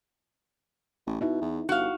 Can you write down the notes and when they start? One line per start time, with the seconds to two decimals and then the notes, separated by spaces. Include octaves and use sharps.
1.07 A1
1.21 B2 D#4 E4
1.41 E2
1.69 G1 F#4 F5